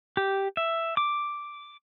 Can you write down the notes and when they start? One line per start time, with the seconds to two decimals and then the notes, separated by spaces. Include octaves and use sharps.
0.17 G4
0.57 E5
0.97 D6